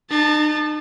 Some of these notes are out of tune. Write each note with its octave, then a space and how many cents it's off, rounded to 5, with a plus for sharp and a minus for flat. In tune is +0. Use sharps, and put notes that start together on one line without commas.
D#4 -40 A5 +0